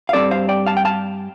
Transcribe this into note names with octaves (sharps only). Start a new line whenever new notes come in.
F5
G2 G3 C4 A4 D5
C5 F5
D5 G5
F5 A5
G5
F5 A5